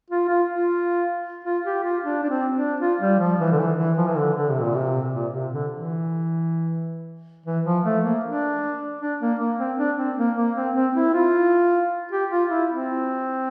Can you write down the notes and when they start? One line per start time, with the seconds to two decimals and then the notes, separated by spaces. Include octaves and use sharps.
0.10 F4
0.29 F4
0.49 F4
1.45 F4
1.65 G4
1.84 F4
2.04 D4
2.23 D4
2.29 C4
2.56 D4
2.80 F4
3.01 G3
3.19 F3
3.40 E3
3.52 D3
3.59 E3
3.78 E3
3.97 F3
4.07 E3
4.17 D3
4.36 D3
4.50 C3
4.62 A#2
4.75 C3
5.13 A#2
5.33 C3
5.53 D3
5.72 E3
7.46 E3
7.65 F3
7.85 A3
8.04 A#3
8.24 D4
9.01 D4
9.20 A#3
9.39 A#3
9.58 C4
9.78 D4
9.98 C4
10.18 A#3
10.37 A#3
10.56 C4
10.75 C4
10.95 E4
11.14 F4
12.11 G4
12.31 F4
12.50 E4
12.69 C4